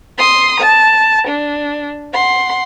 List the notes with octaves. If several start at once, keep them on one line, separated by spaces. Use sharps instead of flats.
C6 D#6
A5
D4
F#5 C6